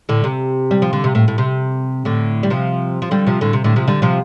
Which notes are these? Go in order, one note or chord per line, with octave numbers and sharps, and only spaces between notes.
A2 D3
C3
G3
F3
D3
C3
A2
A2
C3
A2 D3
G3
C3 F3
F3
D3 G3
C3 F3
A2 D3
C3
A2 D3
C3 F3
D3 G3
C3 F3